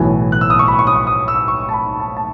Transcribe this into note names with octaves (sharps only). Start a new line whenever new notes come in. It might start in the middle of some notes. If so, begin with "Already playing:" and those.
Already playing: B1 A2 E3 B3 G#5
F#6
E6
D#6
C#6
B5
C#6
D#6
D#6
E6
C#6
A5
B5
A5
A5